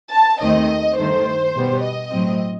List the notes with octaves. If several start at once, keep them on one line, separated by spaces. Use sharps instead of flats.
A5
D#2 D#3 A3 C4 D#5
G2 D#3 A3 C5
B2 G3 B3
D#5
A2 F#3 C4